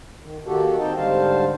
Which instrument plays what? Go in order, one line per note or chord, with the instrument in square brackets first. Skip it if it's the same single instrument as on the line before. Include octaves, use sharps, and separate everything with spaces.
[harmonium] D#3
D#3 A#3 F#4 G4 A4
C4 D#4 D#5 G5 A5
G#2 D3 G3 C5 F5 A5